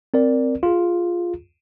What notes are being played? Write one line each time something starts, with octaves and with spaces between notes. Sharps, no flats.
C4 A#4 D5
F4 G#4